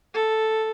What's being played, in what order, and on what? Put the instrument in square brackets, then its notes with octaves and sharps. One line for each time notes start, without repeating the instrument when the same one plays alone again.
[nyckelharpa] A4